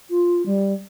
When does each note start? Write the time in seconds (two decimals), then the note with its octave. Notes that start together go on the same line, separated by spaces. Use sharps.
0.10 F4
0.46 G3